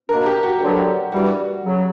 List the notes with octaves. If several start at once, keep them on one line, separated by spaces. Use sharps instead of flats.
B2 A#3 D4 A#4
G4
F#4
D2 D3 F#3 B3
G2 E3 G3 F#4
C#3 F#3